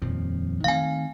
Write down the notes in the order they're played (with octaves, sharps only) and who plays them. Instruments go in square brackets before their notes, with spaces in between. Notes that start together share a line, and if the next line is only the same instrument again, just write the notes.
[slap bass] D#1 F2 F3
[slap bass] D#3 A3 C4 [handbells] F5 G#5